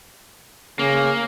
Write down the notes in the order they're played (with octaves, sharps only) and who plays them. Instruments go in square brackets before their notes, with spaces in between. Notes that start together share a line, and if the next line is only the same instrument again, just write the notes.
[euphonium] C#3 [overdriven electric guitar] A#3